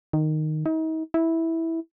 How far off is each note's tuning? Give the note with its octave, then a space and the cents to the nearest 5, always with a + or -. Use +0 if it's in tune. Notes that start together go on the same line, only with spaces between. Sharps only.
D#3 -10
D#4 +40
E4 -10